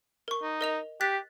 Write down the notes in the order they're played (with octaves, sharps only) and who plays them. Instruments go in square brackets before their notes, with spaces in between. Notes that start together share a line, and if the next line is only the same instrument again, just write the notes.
[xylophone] A#4 C#6
[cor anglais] D#4
[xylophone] A#4 D#5 F7
[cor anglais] G4 [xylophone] F#6 A6 B6